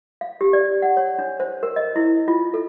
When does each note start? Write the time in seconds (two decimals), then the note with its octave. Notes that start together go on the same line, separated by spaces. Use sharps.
0.21 F5
0.41 G4
0.53 D5
0.82 F#5
0.97 C#5
1.19 D4
1.40 C5
1.63 A#4
1.76 D#5
1.96 E4
2.28 F4
2.54 A4